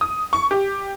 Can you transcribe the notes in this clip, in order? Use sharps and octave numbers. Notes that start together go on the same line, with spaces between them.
D#6
C#6
G4